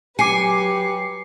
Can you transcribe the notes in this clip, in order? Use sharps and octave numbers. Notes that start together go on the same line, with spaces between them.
F#3 G4 B4 G#5 D6 C7 C#7